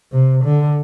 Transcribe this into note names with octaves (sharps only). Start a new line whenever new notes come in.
C3
D3